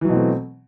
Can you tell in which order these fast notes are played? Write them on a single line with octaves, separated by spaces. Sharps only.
E3 F#3 B2 C4 A3